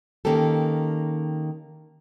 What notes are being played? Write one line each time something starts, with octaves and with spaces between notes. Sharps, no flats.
D#3 A#3 C#4 G4 A4